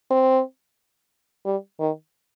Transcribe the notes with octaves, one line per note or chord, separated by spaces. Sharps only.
C4
G3
D#3